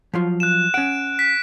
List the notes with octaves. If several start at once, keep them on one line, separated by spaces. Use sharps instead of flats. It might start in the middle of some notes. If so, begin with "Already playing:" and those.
F3 F#3 F4
F#6 E7
C#4 F#5 D7
B6